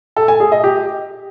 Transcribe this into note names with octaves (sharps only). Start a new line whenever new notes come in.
A4
G#5
G#4
D#5
G4